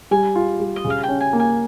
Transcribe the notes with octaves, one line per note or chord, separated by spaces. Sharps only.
G3 G#5
F4
G3
D#5
C#3
F5
G5
C#4
G#5
A#3
G#5